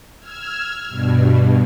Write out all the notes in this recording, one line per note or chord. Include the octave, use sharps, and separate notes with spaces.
E6 F6 G#6
G2 B2